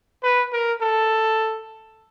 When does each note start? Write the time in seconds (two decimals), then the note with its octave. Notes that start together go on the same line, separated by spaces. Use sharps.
0.23 B4
0.53 A#4
0.81 A4